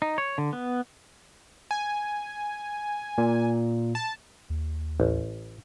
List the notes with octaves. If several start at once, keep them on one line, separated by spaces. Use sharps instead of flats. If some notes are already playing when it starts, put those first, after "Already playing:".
D#4
C#5
D3
B3
G#5
A#2
A5
D#2
A1